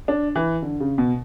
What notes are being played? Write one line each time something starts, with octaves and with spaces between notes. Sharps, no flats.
D4
E3
D3
C#3
B2